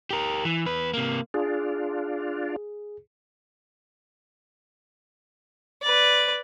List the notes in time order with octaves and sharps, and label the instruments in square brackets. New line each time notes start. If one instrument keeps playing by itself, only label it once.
[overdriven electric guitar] G4 A#4
E3
E2 B4
C3 A#3
[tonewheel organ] D4 F4 [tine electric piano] G#4
[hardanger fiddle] B4 D5